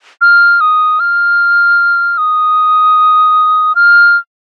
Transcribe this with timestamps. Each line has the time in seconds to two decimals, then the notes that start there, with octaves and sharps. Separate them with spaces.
0.21 F6
0.61 D#6
1.00 F6
2.18 D#6
3.75 F6